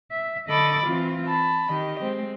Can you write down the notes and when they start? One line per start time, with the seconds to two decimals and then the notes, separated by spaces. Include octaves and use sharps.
0.11 E5
0.47 D3 A4 D#5 B5 D6 A6
0.85 E3 C4 F4
1.27 A5 B5
1.68 D#3 G4 D#5
2.01 G#3 C4